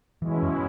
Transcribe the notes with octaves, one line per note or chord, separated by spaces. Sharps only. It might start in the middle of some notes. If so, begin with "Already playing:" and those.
B2 E3 G#3 C#4 E4
F#2